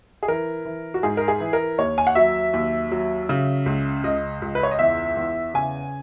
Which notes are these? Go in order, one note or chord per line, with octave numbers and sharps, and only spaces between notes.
G#4
E3 A#4
E3
F#4
G#2 G#4
A#4
G#4
E3
A#4
D#2 C#5
G#5
F#5
F#3 E5
D#2
F#3
C#3
C#2
C#2 D#5
C#2
B4
C#5
D#5
E2 E5
E2
C#3 G#5